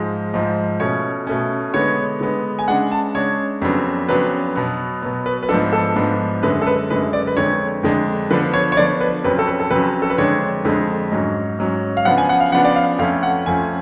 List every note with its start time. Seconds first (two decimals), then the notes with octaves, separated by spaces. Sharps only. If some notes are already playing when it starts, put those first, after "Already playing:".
Already playing: G#2 F3 G#3
0.34 G#2 F3 G#3
0.80 B2 A3 C#4 C#5
1.27 B2 A3 C#4
1.74 D3 G#3 B3 C#5
2.21 D3 G#3 B3
2.59 G#5
2.68 C#3 G#3 D4 F#5
2.91 A5
3.15 C#3 G#3 D4 C#5
3.62 F2 C#3 F#3 B3 D4
4.09 F2 C#3 F#3 B3 D4 B4
4.56 B2 F#3 B3
5.02 B2 F#3 B3
5.26 B4
5.43 B4
5.49 G#2 F3 B3 D4 A4
5.73 A4
5.96 G#2 F3 B3 D4
6.43 F#2 D3 G#3 B4
6.62 A4
6.67 B4
6.90 F#2 D3 G#3 B4
7.13 D5
7.27 B4
7.36 F2 D3 G#3 D4 C#5
7.83 F2 D3 G#3 D4
8.30 D3 F3 B3 D4 B4
8.54 C#5
8.72 C#5
8.77 D3 F3 B3 D4 D5
9.01 B4
9.24 F2 C#3 F#3 C#4 B4
9.39 A4
9.47 B4
9.60 A4
9.71 F2 C#3 F#3 C#4 B4
10.02 A4
10.10 B4
10.18 F2 D3 G#3 D4 C#5
10.65 F2 D3 G#3 D4
11.11 G#2 F#3 C#4
11.59 G#2 F#3 C#4
11.97 F5
12.05 C#3 F3 B3 D4 F#5
12.18 G#5
12.29 F#5
12.40 F5
12.52 C#3 F3 B3 D4 F#5
12.65 D5
12.76 F5
12.99 F2 F3 A3 C#4 F5
13.23 F#5
13.46 F2 F3 A3 C#4 G#5